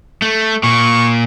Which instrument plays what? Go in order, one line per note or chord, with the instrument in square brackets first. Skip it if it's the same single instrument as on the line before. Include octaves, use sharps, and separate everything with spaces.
[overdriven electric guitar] A3
[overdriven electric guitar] A#2 [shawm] C#6